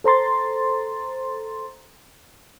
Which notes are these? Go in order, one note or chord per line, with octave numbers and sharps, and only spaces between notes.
A4 C5 A#5 C6 A6